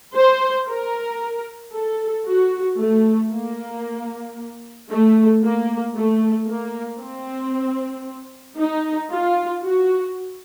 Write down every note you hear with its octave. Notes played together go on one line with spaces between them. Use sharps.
C5
A#4
A4
F#4
A3
A#3
A3
A#3
A3
A#3
C4
D#4
F4
F#4